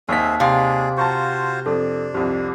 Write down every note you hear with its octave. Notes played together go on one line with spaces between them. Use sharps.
D#2 C4 D#4 G#4 E5 B6
C3 G#4 D5 F5
F4 F#4 C5 A5 A#5 C#6
F2 D4 A4
C2 F2 G4